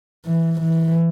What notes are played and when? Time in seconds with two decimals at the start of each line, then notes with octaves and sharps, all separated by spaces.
0.26 E3
0.61 E3